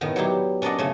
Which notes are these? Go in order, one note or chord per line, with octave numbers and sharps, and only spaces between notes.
A2 D#3 B3
F#3 G3 D#4 E4 G4
C#4 D4 A#4 D5 D#5 F#5
C#3 A3 C#4